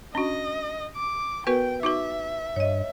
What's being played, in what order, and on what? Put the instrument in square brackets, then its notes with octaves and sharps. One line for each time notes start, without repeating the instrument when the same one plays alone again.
[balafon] C#4 D4 F#4 [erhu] D#5
[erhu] D6
[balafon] B3 F#4 A#4 [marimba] B4 [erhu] G5
[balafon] D#4 F#4 B4 [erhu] E5 [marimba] D6
[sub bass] G2 [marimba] C#5 D#5